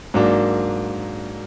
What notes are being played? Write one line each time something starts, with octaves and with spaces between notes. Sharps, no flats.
G#2 F#3 A#3 D4